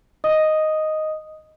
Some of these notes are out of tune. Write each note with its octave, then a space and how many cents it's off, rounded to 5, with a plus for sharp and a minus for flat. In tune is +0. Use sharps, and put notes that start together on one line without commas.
D#5 +0 D#6 +0